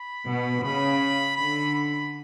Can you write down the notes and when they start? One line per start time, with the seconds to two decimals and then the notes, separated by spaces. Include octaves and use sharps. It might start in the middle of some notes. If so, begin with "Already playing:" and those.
Already playing: B5
0.27 B2
0.63 C#3 B5
1.37 D3 B5
1.74 B5